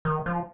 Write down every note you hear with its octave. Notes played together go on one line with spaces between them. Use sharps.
D#3
F3